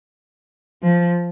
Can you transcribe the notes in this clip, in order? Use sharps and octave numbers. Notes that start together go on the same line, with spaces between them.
F3